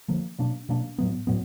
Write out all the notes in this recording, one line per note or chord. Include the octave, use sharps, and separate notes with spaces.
D3 F3 A#3
B2 F#3 A#3 D4
B2 F#3 A#3 D4
A2 F#3 B3
A2 F#3 B3